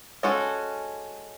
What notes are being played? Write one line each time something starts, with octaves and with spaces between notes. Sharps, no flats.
G#3 C#4 F#4 A4